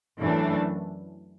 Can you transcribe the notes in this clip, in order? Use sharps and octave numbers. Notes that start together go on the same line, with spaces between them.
F#2 E3 A3 D4